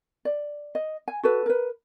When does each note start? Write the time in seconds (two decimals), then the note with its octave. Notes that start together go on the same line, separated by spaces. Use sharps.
0.25 D5
0.75 D#5
1.08 G#5
1.23 F#4 A4 B4
1.46 A#4 B4